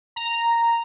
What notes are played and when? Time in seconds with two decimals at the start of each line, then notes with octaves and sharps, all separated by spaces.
0.16 A#5